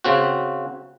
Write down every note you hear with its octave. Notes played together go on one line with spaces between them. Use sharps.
C#3 C4 F#4